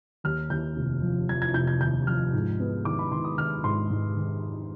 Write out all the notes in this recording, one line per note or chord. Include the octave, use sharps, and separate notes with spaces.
D#2 F6
D#2 G6
F1
F3
F3 G#6
G#6
F1 G6
G#6
D#2 G6
F3 F6
G#2
B3
D#3 D6
B5
D#3 C6
D#6
D#3 F6
G#2 C6
G#2
D#3